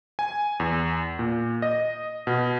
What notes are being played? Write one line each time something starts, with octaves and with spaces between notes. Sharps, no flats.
G#5
E2
A#2
D#5
B2